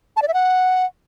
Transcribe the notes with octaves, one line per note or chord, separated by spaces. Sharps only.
A5
D5
E5
F#5